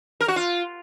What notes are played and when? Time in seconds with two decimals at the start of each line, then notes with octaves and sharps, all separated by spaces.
0.21 A#4
0.28 F#4
0.36 F4